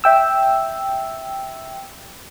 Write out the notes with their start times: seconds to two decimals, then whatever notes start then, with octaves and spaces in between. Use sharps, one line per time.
0.04 E5 G5 E6